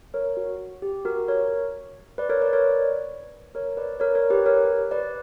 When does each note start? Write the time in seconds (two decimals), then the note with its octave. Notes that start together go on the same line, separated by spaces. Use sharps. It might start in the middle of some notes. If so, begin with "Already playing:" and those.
0.14 A#4 C#5
0.37 F#4
0.82 G4
1.05 F#4 A#4
1.28 A#4 C#5
2.18 B4 D5
2.29 A#4 C#5
2.42 B4 D5
2.53 A#4 C#5
3.55 A#4 C#5
3.77 B4 D5
4.00 A#4 C#5
4.15 A#4 C#5
4.30 G4 B4
4.46 A#4 C#5
4.91 B4 D5